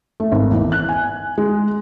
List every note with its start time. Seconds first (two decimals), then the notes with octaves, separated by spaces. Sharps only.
0.20 A3
0.32 G#1
0.51 E2
0.72 F#6
0.89 G#5
1.38 G#3